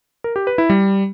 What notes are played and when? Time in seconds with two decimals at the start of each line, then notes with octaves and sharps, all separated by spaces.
0.24 A#4
0.36 G4
0.47 B4
0.58 E4
0.70 G3